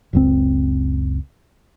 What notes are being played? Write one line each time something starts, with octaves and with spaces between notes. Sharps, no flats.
F#1 C#2 C4